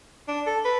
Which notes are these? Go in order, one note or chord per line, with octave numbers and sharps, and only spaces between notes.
D4
A4
B4